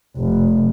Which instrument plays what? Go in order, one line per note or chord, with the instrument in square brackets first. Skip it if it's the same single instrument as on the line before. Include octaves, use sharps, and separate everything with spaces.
[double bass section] F1